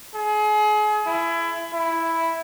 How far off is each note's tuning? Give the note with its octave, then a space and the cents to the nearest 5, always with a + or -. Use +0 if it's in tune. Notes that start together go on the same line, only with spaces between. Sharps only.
G#4 +35
E4 +25
E4 +0